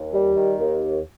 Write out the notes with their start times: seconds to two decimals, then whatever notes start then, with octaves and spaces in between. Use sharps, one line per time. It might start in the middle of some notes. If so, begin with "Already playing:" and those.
Already playing: D#2
0.13 G3
0.36 D#3
0.59 D#2